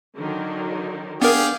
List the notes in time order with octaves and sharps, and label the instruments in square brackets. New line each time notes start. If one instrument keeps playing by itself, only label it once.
[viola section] D3 D#3 F#3
[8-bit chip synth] B3 A#4 [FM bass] D4 [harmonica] G4 G#4 F5